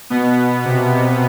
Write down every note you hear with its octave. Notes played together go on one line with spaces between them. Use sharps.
B2 B3
C3